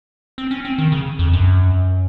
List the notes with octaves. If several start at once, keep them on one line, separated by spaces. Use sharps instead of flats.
C4
C#4
C4
D#3
C#3
F2
F#2